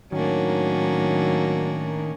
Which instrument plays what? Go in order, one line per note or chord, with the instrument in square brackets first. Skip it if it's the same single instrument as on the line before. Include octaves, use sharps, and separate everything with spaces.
[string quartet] A2 D4 [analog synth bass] D#3 [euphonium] F#3 [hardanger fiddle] A#3 C#4